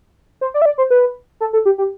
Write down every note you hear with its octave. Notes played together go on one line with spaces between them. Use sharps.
C5
D5
E5
D5
C5
B4
A4
A4
G4
G4